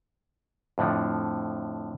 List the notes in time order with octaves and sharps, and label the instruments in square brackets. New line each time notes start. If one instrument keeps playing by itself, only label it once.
[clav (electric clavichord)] F2 A2 D3 F3